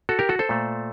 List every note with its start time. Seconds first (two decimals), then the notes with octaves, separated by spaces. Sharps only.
0.09 F#4 A4
0.19 G4 A#4
0.29 F#4 A4
0.39 A4 C5
0.49 A#2 A3